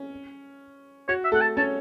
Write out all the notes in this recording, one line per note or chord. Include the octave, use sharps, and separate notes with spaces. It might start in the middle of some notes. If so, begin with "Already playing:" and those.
Already playing: C#4
F#4 C#5
E5
A3 A4 F#5
A5
C#4 C#5 A5